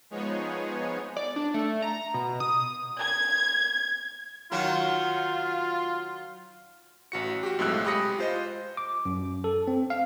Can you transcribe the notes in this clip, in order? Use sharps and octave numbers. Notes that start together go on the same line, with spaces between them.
F3 G#3 B3 D#4 G#4 C#5
D5
D4
A3
A#5
B2
D#6
G#6
D#3 F#3 F4 F#4
A1 F#4 C#7
F#4 G4
B1 F2 A2 G#3 E6 F#6
G#3 G4 B5 D#6 A#6 C#7
F4 C5 D#5
D6
F#2
A4
C4
F5